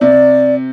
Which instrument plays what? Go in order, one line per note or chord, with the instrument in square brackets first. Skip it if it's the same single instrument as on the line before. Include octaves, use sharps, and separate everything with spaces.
[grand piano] C3 [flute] D5